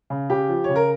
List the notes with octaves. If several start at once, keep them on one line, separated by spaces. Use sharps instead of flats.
C#3
C#3 G4
F3
C#3 C#5
A#4